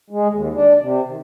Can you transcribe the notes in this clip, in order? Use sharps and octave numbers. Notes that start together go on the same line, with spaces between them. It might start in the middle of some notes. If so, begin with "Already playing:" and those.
G#3
D#2
D4
C3
D#3